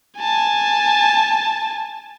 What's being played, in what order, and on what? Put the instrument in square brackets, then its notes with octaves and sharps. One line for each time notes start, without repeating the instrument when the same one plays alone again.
[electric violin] G#5 A5